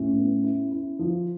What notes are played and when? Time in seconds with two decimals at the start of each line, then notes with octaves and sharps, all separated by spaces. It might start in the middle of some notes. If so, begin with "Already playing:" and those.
Already playing: A2 C#4
0.17 B3
0.44 E4
0.71 E4
0.99 F3